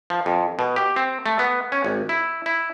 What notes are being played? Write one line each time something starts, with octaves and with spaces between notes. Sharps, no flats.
F3
F2
B2
G4
C4
A3
B3
C#4
G#1
E4
E4